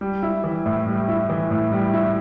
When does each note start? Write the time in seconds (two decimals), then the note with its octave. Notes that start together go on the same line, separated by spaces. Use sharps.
0.01 G3
0.23 E4
0.44 E3
0.66 A2
0.87 G3
1.08 E4
1.30 E3
1.51 A2
1.72 G3
1.93 E4